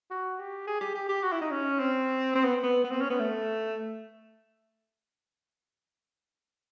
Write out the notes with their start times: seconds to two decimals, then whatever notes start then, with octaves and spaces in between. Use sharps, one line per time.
0.11 F#4
0.39 G4
0.67 G#4
0.81 G4
0.95 G4
1.09 G4
1.23 F#4
1.32 E4
1.41 D#4
1.51 C#4
1.79 C4
2.35 C4
2.44 B3
2.63 B3
2.84 B3
2.91 C4
3.01 C#4
3.10 B3
3.20 A3